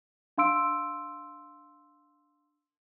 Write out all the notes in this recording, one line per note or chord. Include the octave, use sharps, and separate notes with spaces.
D4 F5 C6 E6 D7